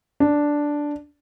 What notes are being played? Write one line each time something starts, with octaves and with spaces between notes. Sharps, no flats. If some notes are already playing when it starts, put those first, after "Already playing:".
D4